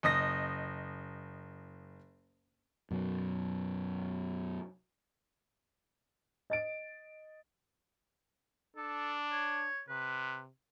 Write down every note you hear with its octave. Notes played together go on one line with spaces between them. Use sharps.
F#1 D#5 D#6 A#6
F#2 B2 F#3
D#5 A6 D7
D4 A4
C#5
C3 B4